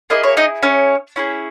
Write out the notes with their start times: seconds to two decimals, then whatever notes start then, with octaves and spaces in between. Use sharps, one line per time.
0.10 A#3 E4 G#4 D#5
0.23 C#5
0.37 D#4 D#5
0.63 C#4 C#5
1.16 C#4 E4 G#4